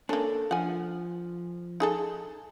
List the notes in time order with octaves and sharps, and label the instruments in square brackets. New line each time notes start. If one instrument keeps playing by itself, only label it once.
[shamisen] A#3 C#4 [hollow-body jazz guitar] D4 A4
[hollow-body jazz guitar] F3 [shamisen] F#5 G#5
[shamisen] D#4 G#4 A4